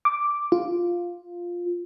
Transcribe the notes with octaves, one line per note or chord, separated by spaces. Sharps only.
D6
F4